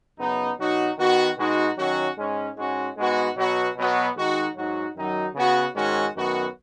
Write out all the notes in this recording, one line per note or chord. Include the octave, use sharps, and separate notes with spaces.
F#2 C#3 B3 D#4
B2 F#3 D#4 F#4
D#3 B3 F#4
B2 G#3 D#4 F#4
D#3 F#3 C#4 F#4
G#2 G#3 C#4
G#2 G#3 C#4 F#4
G#2 G#3 B3 F#4
B2 F#3 B3 F#4
B2 F#3 B3 F#4
D#3 G#3 D#4 F#4
G#2 F#3 D#4 F#4
F#2 D#3 F#3 D#4
C#3 B3 F#4
G#2 D#3 G#3 C#4 F#4
F#2 D#3 B3 F#4